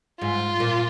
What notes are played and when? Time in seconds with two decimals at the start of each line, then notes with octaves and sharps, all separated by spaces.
0.21 G#2 F4
0.60 A#2